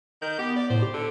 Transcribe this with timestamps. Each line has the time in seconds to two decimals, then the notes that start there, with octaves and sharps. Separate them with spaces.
0.22 D#3 G6
0.39 B3 G4
0.56 D5
0.70 A2 C5
0.82 G4
0.94 D3 A4